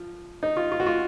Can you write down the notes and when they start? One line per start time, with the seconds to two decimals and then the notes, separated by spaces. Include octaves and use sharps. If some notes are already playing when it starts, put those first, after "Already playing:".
Already playing: F3
0.43 D#4
0.57 F4
0.72 F4
0.80 F#4
0.87 F4